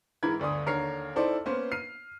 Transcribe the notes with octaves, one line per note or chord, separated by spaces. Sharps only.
G#2 E3 E4 A#4 B5 G#6
G1 D2 D5 C6 D#6
D#2 D3 A#4 C#5 F6 C7
C4 D#4 E4 A4 C5 D5
A#3 B3 C#4 B4 C5
F6 C7 D#7